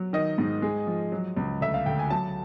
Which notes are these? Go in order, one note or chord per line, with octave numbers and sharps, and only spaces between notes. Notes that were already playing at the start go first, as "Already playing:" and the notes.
Already playing: F#3
D#3 D#5
G#2
G#3
F3
F#3
C#2
D2 E5
F5
D2 G5
G#5
F#3 A5